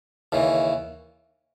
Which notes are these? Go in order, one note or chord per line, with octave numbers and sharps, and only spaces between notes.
D#2 C#3 E3